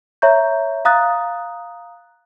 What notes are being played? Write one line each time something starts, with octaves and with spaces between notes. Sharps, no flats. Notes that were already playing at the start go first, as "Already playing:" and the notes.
C#5 E5 A#5 C#6 G6
F5 A#5 D#6 F#6 A6